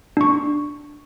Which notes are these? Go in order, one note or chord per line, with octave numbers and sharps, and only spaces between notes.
D4 C#6